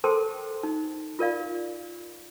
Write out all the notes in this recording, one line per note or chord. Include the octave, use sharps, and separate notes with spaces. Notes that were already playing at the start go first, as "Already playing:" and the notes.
A4 A#4 C5 G5 A5 C6
D#4
F4 A#4 D5 F5